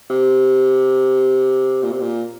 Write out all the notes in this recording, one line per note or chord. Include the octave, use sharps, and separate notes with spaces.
C3
A#2
C3
A#2